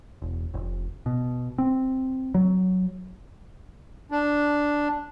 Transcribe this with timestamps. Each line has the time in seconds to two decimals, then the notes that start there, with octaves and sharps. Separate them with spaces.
0.22 E1
0.54 F1
1.06 B2
1.58 C4
2.34 F#3
4.11 D4